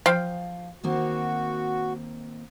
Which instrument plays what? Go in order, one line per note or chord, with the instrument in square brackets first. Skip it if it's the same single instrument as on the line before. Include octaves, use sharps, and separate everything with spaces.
[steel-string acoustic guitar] F3 F4 [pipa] C5 F5 G5
[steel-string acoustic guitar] D#3 A#3 C4 [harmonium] F#4